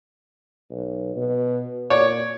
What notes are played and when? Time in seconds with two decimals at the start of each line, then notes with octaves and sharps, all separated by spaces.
0.70 B1
1.16 B2
1.90 A#2 C#5 D5